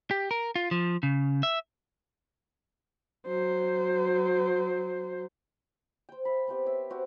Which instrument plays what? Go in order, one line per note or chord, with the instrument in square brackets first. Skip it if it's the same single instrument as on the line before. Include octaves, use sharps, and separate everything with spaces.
[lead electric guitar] G4
A#4
F4
F3
C#3
E5
[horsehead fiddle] F#3 C5
[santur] C5 G5
E5 B5
B3 C4 G4 D#5
C#5 E5
C4 F#4 G4 E5